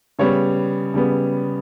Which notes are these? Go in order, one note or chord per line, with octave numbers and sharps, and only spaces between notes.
C#3 G3 B3 C#5
C#3 G3 B3